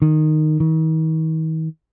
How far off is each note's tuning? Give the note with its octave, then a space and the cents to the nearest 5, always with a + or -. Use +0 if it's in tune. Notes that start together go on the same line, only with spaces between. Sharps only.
D#3 -10
D#3 +40